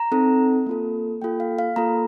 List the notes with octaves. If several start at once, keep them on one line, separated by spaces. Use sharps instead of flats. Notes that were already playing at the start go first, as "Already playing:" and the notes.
Already playing: A#5
C4 D#4 A4
A#3 F4 A4
A#3 F4 A4 G5
F5
F5
A#3 F4 A4 A#5